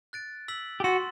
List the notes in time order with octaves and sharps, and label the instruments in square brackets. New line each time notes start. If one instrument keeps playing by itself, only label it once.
[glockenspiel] F#6 A6 D7
E6 B6 F#7
[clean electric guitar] G4
[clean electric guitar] F#4 [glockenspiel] C6 E6 A6